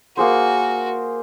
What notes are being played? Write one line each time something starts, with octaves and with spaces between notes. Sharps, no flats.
A#3 F#4 G#4 C5